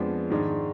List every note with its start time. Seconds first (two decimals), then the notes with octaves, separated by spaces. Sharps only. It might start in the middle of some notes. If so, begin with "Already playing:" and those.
Already playing: F2 F3 G#3 B3 D4
0.30 G#2 D#3 G#3 D4